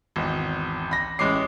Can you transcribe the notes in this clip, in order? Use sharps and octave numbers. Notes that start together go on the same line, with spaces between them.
G#1 E2
B5 A#6
A1 G#3 C#4 D6 C7